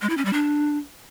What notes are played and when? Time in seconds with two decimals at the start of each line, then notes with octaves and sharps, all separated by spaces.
0.02 G#3
0.10 E4
0.17 C#4
0.25 G3
0.33 D4